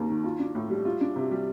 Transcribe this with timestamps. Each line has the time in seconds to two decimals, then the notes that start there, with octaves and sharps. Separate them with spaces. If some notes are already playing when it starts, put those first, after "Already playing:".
Already playing: D#2 A#3
0.09 D#3
0.24 F4
0.39 D4
0.55 A2
0.70 G3
0.85 F4
1.01 D4
1.16 C3
1.31 G3